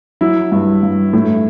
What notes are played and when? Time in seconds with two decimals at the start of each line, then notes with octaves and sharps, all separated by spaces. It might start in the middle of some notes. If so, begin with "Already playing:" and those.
0.21 F#3 E4
0.52 G2
0.83 G2
1.13 A2